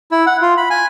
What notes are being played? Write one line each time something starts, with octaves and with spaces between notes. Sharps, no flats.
E4
F#5
F4
B5
G#5